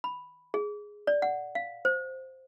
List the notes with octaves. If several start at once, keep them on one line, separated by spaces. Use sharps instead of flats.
B5
G#4
D5
F#5
F5
C5